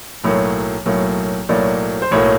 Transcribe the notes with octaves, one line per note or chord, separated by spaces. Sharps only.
B1 A2 F#3 A#3
B1 A2 F#3 A#3
B1 A2 F#3 A#3 D5
C5
B1 A2 F#3 A#3 C#5